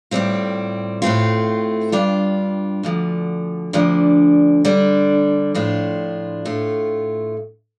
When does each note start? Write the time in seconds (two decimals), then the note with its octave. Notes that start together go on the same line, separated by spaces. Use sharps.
0.11 A2 G3 C4 F4
1.02 A2 A3 C4 F4
1.92 G2 G3 D4 F4
2.83 D2 D3 F3
3.73 D2 D3 F3 D4
4.65 D3 G3 D4
5.55 A2 F3 D4 F4
6.46 A2 A3 F4